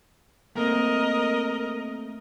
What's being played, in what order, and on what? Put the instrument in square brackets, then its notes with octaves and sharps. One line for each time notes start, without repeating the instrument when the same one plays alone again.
[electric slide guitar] A3 A#3 C4 [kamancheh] A#4 D#5